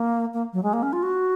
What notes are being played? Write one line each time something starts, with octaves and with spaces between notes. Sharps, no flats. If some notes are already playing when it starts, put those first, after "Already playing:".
Already playing: A#3
A#3
F#3
G#3
A#3
C#4
F4
F#4